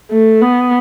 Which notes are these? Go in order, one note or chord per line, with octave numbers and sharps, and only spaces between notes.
A3
B3